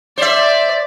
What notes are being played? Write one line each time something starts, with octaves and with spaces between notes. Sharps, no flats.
C5 D5 E5